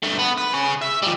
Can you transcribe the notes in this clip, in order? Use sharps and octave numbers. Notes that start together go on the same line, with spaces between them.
G2 A3
B3
B4
G#4 C#5
E5
F3 G3